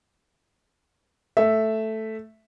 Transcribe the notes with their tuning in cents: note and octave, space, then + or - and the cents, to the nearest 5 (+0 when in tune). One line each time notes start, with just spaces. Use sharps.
A3 +0 E5 +0